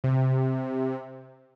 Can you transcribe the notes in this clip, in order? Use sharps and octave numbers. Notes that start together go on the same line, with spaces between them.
C3